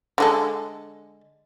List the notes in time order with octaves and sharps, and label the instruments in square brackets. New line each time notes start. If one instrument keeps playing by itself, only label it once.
[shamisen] D3 G#3 A4